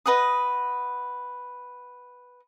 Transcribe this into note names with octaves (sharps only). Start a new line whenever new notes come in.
B4 D#5 F#5 D#6